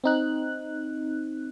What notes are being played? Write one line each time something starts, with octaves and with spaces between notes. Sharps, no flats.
C4 D#4 F#6